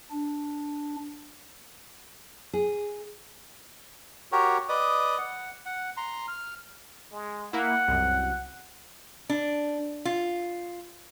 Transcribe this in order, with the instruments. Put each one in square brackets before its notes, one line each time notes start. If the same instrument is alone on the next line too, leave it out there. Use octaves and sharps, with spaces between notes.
[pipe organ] D4
[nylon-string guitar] G#4
[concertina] F#4 G4 A#4 C#5
B4 D5 D#5 D#6
F#5
F#5
A#5 C6
F6
[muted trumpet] G#3
[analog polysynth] A#3 E4 [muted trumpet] F#5
[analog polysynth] C2 F#2
[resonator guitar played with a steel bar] D4
F4